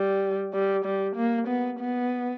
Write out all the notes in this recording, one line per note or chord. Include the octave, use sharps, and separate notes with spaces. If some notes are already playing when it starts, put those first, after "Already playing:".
Already playing: G3
G3
G3
A#3
B3
B3